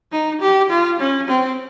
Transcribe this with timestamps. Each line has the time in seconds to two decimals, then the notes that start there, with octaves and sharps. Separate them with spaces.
0.12 D#4
0.41 G4
0.70 F4
1.00 C#4
1.28 C4